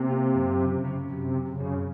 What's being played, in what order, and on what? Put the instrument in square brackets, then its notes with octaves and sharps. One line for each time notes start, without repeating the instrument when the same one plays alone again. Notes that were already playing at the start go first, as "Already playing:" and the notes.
Already playing: [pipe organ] C3 [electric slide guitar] A#3
[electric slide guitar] F4
F#2
C#3
C#3
[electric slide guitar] F#2 [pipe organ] C3
[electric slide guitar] F#2
[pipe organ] C#3
[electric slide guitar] F#2